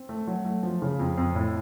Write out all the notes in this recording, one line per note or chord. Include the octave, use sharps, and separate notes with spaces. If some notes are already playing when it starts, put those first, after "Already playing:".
Already playing: C4
A3
F#3
A3
F3
C#3
F2
F2
A2